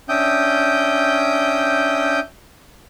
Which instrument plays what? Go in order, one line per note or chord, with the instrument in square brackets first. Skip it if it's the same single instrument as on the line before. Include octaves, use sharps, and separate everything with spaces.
[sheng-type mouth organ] C#4 D4 E5 G5 D#6 G6